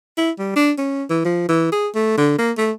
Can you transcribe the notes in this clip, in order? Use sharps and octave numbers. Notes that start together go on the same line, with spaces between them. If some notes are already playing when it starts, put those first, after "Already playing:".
E4
G3
D4
C#4
E3
F3
E3
G#4
A3
D3
A#3
A3